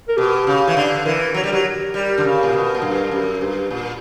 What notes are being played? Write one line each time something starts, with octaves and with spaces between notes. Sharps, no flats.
A#4
B2 G4
C#3
E3
D3
E3 A#4
F#3
G3
F#3
G3
D3
C#3
A#2
B2
A#2
G2
F#2
G2
A#2